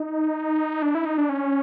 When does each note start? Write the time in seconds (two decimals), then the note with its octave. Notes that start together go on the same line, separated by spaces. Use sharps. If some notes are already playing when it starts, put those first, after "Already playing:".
Already playing: D#4
0.82 D4
0.95 E4
1.05 D#4
1.18 D4
1.29 C#4